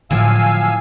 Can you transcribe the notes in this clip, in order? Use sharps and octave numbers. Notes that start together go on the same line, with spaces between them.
A2 D3 F3 F#3 F5 G#5 E6